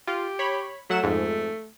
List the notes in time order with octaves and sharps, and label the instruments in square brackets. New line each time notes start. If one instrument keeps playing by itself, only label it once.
[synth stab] F4 [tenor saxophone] G4
[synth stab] C#5 B5
[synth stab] F#3 F#5 E7 [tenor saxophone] A3
[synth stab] F2 G#2